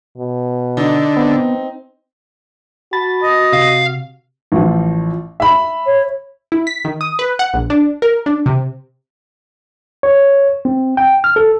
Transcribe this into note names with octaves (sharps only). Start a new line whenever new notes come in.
B2
D3 D#4
B3 C4
F#4 A5 B5 A6
D#5
C3 F5
A1 F3
E5 B5
C#5
E4
B6
D#3
D#6
B4
F#5
A#1
D4
A#4
D4
C3
C#5
C4
G5
F6
A4